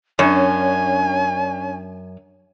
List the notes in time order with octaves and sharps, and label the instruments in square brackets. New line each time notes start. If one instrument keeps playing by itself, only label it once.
[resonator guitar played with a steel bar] F#2 [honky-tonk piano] C#4 D4 [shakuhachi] G#5